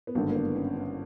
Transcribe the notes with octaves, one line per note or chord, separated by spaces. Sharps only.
B3
G#1 G2 D3 A#3
A#3
B3
C#4
C#4